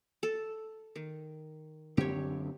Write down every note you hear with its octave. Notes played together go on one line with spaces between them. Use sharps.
A4
D#3
F#2 D3 C4 G4 C#5